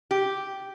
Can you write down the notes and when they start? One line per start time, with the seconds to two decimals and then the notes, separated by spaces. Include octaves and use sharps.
0.11 G4